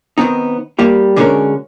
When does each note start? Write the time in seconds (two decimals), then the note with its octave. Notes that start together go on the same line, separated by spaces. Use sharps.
0.18 D#3 B3 C4 D#4
0.79 G3 A#3 G4
1.16 D3 G#3 B3 C#4 F#4 A#4